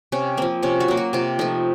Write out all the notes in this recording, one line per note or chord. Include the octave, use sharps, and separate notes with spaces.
C3 C#4
F3 A#3 C4
C3 C#4
F#4
F#3 A#3
F#4
C3 F4
F3 A3 D#4